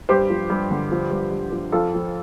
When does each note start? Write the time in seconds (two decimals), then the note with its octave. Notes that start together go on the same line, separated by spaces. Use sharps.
0.09 G2 G4 C5
0.30 F3
0.50 G2
0.70 D3
0.91 F3
1.11 G2
1.31 G2
1.52 F3
1.72 F2 F4 A4
1.94 F3